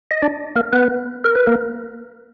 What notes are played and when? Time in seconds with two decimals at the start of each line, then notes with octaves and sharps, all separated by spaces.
0.11 D#5
0.22 D4 D5
0.56 A#3 A#4
0.73 B3 B4
1.24 A#4
1.35 B4
1.46 A#3 A#4